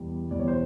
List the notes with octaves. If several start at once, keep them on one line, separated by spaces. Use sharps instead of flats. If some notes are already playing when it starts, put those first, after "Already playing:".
Already playing: E2 B2 G3
E2 B2 G3 D5
C#5
C5